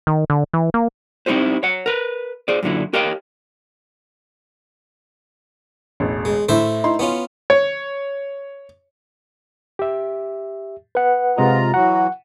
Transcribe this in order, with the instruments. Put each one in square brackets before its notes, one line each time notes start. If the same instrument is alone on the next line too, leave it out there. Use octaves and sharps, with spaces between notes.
[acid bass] D#3
D3
E3
A#3
[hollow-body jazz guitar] C4 D#4 E4 F#4 G4 C5
C#5 F#5
A#4 B4
G#4 C5 D5
F#2 A#2 D3 E4
G4 A#4 C#5 D#5 F5 G5
[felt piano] E1 A1
[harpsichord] G#3
[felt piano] A2 E4 [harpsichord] A3 C5 E5
[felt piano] D#4 E4 C6
[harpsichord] B3 C#4 F4
[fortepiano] C#5
[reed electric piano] G4 E5
[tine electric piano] B4 F#5
[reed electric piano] C3 G#3 D#5 [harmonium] F4 A#5
[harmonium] E3 F#3 F#4 [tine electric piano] F#5 [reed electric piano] A#5